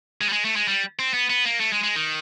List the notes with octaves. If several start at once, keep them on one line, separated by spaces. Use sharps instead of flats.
G#3
G3
G#3
A3
G#3
G3
C4
B3
B3
A#3
A3
G#3
G#3
D#3